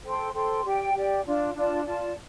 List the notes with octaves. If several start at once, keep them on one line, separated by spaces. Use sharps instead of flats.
A4 C5 G5 C6
A4 C5 G5 C6
G4 D5 G5
G4 D5 G5
D4 F4 D5 A5
D4 F4 D5 A5
F4 D5 A5